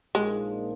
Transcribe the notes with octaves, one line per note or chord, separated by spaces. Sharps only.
A#1 A#2 F3 G#3 A#3 D#4